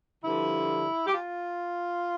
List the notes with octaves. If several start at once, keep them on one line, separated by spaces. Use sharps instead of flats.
G2 D3 F3 E4
G4
F4